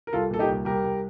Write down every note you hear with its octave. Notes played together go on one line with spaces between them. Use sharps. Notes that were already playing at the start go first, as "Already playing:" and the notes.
A#4
C2 F4 A4
A#2 A4
D#4 G4
C2
C2 G4 A#4
C2